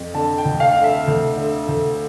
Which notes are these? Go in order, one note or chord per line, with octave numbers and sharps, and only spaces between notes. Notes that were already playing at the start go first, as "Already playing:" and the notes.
Already playing: F2
D3 A5
G5
D2
F5
D3
E5
D2
D3
D2